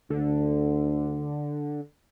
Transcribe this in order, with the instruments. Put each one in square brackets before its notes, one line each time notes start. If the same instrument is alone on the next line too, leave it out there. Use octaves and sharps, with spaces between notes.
[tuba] D2 [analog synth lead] D3